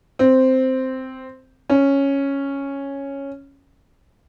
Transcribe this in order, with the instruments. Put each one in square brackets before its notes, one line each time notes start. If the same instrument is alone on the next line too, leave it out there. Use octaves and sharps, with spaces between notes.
[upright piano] C4
C#4